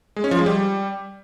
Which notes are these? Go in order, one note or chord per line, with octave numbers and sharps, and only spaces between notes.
G#3
C#4
F3
G#3
G3